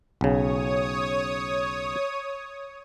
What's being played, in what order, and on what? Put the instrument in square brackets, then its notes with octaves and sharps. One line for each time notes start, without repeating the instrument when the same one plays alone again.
[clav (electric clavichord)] B1 C#3 [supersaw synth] C#5 D#6